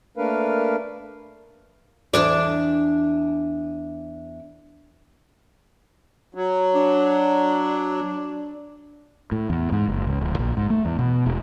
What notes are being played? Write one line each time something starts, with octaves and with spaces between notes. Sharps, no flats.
A3 A#3 D4 A#4 B4 F5
E2 D4 D5
F#3
D4
A2
E2
G#2
F#1
C#2
D1
A#1
G#2
A3
E2
B2
E1